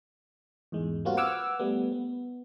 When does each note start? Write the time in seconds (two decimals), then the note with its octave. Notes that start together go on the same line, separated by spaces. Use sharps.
0.72 E2 G#2 G#3
1.05 G3 A#3 C4 F4 F#4
1.17 B4 F#5 D6 E6 F6 G#6
1.59 G3 A3 B3
1.92 B3